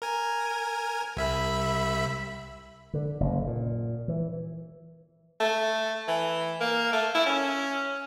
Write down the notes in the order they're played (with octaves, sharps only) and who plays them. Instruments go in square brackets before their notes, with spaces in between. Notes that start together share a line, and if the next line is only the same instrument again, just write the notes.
[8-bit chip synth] A#4 G#5
C2 E5 B5
[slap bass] D3
F#1
A#2
E3
[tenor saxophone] A3
E3
A#3
A3
E4
C#4